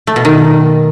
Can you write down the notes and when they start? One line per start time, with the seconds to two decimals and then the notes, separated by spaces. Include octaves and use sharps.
0.07 A3
0.16 B2
0.25 D#3